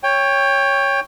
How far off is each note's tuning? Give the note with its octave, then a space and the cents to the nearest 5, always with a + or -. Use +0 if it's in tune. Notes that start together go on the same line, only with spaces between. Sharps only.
C#5 +0 G5 +20